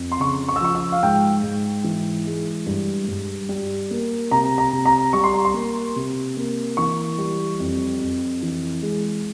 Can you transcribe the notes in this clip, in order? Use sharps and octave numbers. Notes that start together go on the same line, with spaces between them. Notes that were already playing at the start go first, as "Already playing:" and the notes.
Already playing: F2
C6
C#3 C#6
C#6
E6
F3 C#6
E6
F5
G#2 G5
G#2
E3
G#3
G2
G2
G3
A#3
C3 A#5
A#5
C3
A#5
G3 C#6
C6
A#5
C6
A#3
C3
A#3
E3 C#6
G3
F2
F2
E3
G#3